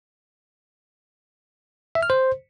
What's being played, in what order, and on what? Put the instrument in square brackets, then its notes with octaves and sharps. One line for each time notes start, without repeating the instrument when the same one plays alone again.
[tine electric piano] E5
F6
C5